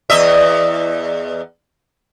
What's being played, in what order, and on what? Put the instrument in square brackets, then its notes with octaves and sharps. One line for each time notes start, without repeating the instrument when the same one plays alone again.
[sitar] E2 D#5 E5